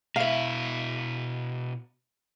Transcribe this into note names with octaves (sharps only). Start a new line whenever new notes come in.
B2 E4 E5 F5